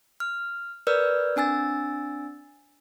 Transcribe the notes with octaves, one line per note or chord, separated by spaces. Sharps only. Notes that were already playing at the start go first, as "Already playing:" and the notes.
F6
A#4 B4 D5 E6 F6 G6
C4 D4 G#5 E6 A6